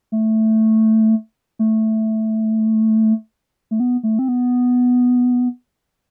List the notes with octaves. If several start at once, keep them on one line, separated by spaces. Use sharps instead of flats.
A3
A3
A3
B3
A3
C4
B3